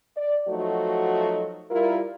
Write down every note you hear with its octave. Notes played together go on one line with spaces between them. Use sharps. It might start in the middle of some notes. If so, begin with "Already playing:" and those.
D5
F3 F#3 A3 D#4 F#4
G3 E4 F4 A#4